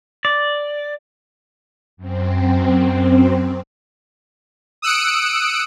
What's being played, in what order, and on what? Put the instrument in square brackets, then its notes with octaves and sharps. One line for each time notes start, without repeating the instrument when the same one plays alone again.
[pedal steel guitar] D5
[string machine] F#2 C4
[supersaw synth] D#6 E6 F#6 C#7 D7